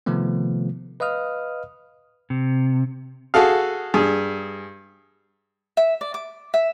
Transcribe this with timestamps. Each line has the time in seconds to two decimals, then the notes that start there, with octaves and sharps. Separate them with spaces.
0.06 C3 D#3 F3 A3 B3
1.00 B4 D#5 F5 D#6 F6
2.30 C3
3.34 F#4 G#4 A4 F5
3.94 G2 G#4
5.77 E5
6.01 D5
6.14 D6
6.54 E5